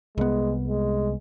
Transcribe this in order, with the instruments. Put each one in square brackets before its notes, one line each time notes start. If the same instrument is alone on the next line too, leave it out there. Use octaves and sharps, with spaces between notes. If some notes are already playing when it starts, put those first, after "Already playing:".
[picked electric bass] C2 B3 [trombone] G#3
[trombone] G#3